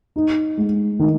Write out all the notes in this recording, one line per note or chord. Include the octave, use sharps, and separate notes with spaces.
D#4
G#3
D#3